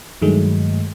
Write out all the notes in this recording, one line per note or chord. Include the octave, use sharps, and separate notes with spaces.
G2 D#3 F#3 G#3 A3